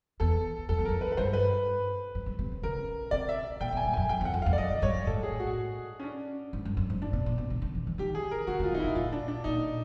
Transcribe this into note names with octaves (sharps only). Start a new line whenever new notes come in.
E2 A4
F2 A4
E2
A#4
F2
B4
B4
G2 C5
B4
G2
G2
C3
C#3
C#3 A#4
C3 D5
E5
A#2 G5
B2
G#5
G2
G#5
F#2
G5
F2
F#5
F2
F5
F2
D5
F#2 D#5
F#2
G2 C#5
A2 A4
G#4
F#4
C#4
D4
G#2
G2
F#2
G#2
A2 D4
B2
A#2
B2
C#3
D3
E3
E3
D#3 G4
G#4
A#4
D3 F#4
C#3
F4
C3
D#4
E4
B2
A#2 F4
D4
D4
A#2 D#4